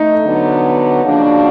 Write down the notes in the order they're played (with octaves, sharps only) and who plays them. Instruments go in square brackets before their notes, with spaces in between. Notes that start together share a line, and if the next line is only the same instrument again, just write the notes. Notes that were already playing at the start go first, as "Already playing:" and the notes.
Already playing: [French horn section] A3 [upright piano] D#4
[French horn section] D3 F#3 B3
C#3 F3 A#3 D4 F#4